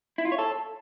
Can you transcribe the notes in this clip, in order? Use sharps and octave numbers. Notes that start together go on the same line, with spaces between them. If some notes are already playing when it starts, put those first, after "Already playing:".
E4
F4
C#5
A4